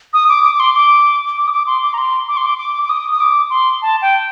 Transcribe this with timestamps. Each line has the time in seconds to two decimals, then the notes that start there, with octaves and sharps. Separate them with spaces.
0.13 D#6
0.29 D6
0.44 D6
0.55 D6
0.60 C6
0.75 D6
1.37 D6
1.47 D#6
1.52 D6
1.67 C6
1.83 D6
1.94 A#5
1.98 C6
2.28 D6
2.37 C6
2.46 D6
2.58 D6
2.82 D6
2.89 D#6
3.12 D#6
3.20 D6
3.50 C6
3.82 A5
4.02 G5